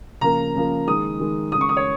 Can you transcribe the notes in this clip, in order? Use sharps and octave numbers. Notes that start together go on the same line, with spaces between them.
C#3 F3 A#3 A#5
C#3 F3 A#3
D#3 G#3 D#6
D#3 G#3
C#3 G#3 D#6
C#6
D#6
C#5